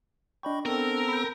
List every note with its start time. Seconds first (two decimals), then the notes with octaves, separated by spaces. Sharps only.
0.43 D4 D5 D#5 G5 B5 C#6
0.66 B3 C4 A4 A#4
1.08 B5 G6